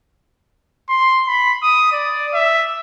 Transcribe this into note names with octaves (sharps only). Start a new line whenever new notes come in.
C6
B5
D#6
D5
E5